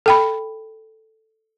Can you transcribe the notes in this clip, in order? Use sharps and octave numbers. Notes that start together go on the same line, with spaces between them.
A4 G5 B5